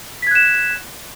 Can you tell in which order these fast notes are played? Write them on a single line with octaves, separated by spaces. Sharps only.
B6 G#6 F#6 E7